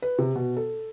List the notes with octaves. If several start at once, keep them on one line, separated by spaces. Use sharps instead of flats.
B4
C3
B2
A4